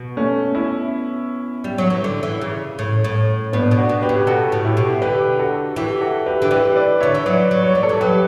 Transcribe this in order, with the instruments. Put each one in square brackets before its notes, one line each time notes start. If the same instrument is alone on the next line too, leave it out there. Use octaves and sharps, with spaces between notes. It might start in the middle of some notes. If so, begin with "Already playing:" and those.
Already playing: [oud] B2
[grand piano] A3 C#4
C#4 E4
[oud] G3
F#3
E3
D3
E3
C#3
A2
A2
[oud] A2 [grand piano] B3 D4
[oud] B2
[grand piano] D4 F#4
[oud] B2
[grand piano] G4 B4
[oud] C#3
[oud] B2 [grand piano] F#4 A4
[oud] A2
[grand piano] E4 G4
[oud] B2
[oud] D3 [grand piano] G4 B4
[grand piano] F#4 A4
[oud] E3 [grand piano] E4 G4
[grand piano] F#4 A4
G4 B4
[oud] D3
[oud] E3 [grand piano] G4 B4
[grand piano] B4 D5
[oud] D3 [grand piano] C#5 E5
[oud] E3
[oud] F#3 [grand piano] B4 D5
[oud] F#3
[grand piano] C#5
[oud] E3 [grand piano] D5
[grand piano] A4 C#5
[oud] E3
[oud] F#3 [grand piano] G4 B4